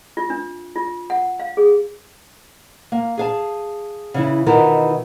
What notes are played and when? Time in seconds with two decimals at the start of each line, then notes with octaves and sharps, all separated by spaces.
0.17 F4
0.30 D4
0.75 F4
1.10 F#5
1.40 F5
1.57 G#4
2.92 A#3
3.17 G#4 F5 A5
4.14 C#3 E3 E4
4.46 B2 D#3 E3 E4 F4 A#4